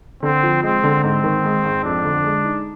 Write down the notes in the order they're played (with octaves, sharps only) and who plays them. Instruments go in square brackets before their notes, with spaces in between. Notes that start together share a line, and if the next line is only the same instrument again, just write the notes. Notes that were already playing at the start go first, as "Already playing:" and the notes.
[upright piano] D3 [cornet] C4
[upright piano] F3
[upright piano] G#3 [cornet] C4
[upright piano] D3
[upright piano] G#2 [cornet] C4
[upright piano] D#3
G#3
G#2
[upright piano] F2 [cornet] D4
[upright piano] D3
G#3
D#4